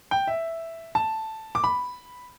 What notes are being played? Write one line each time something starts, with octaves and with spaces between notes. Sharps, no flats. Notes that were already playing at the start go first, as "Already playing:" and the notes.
G5
E5
A5
D6
B5